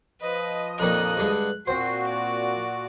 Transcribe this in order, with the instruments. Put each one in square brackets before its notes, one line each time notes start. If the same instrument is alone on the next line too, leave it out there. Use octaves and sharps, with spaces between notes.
[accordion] F3 D#5 [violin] B4
[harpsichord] F2 A#2 D#3 [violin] F#6
[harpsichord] G2 D3 G#3
[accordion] A#2 F#4 [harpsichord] C4 C5 [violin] C7
[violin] D5